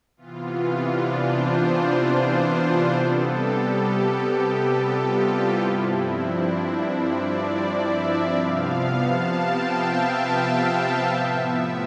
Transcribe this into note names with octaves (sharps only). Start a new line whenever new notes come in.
C3 E3 B3 F4
D4
C5
C3 G3 B3 A4
G4
G4
A4
F4
E4
G2 F3 C4 E4
D4
E4
D5
E5
C3 F3 B3 F5
A5
G5
E5
E5
A2 F3 B3 E5
E5